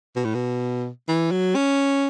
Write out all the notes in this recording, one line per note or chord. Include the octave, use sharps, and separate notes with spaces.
B2
A2
B2
E3
F#3
C#4